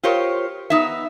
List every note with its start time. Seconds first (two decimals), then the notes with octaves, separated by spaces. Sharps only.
0.03 F4 G4 A#4 C5 C#5
0.70 B3 D#4 E5